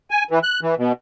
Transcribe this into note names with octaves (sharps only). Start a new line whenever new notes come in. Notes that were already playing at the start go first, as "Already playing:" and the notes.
G#5
E3
F#6
E3
B2